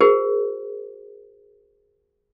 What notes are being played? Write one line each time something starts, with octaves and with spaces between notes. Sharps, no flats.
F#4 G#4 A#4 C5